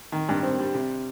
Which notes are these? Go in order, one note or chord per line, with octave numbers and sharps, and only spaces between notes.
D#3
G2
C4
G3
C3